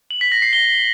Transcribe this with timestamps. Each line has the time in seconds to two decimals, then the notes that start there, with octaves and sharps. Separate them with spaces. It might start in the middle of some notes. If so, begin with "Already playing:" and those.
0.11 F#7
0.21 B6
0.32 A#6
0.42 C7
0.53 G7